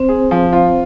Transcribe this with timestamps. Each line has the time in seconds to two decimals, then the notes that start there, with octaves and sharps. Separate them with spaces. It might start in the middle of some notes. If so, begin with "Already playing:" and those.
Already playing: C4 C5
0.09 G#4
0.31 F3
0.53 F4